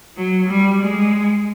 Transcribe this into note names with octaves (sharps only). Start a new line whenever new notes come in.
F#3
G3
G#3